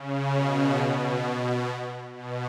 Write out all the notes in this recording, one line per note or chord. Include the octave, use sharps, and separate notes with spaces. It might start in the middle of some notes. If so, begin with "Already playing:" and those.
Already playing: C#3
B2
B2
B2